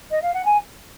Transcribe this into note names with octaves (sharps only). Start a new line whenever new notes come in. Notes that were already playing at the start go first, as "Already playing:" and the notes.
D#5
F5
F#5
G#5